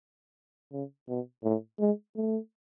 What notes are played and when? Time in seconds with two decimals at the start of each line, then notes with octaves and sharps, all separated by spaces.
0.72 C#3
1.09 B2
1.44 A2
1.80 G#3
2.16 A3